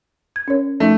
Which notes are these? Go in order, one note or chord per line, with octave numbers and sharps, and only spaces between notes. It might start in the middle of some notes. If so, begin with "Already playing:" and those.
G#6
C#4 A#4 C#5
F3 A3 C#4 D#4